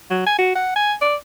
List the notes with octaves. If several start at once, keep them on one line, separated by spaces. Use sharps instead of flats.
F#3
G#5
F#4
F#5
G#5
D5